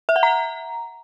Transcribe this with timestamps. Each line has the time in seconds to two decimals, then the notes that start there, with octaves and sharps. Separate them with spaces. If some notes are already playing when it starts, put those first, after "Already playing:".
0.09 E5
0.16 F#5
0.23 A#5